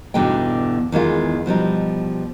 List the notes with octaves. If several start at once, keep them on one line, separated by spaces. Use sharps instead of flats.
E2 G2 B2 D3 D#4 G5
E2 D#3 G#3 F4
B2 F3 G3 D#4